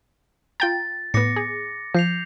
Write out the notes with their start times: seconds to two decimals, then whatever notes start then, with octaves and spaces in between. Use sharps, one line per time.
0.60 F4 G5 A#5 A6
1.14 A2 B3 D6 A#6 C#7
1.36 G#4
1.95 F3 G6 C7 F7